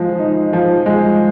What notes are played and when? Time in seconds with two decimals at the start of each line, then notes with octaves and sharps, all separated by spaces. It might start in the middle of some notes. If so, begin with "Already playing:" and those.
Already playing: F3 G#3
0.19 D#4
0.53 F3
0.86 G#3